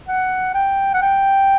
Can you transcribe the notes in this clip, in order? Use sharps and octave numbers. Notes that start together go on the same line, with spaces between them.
F#5
G5
F#5
G5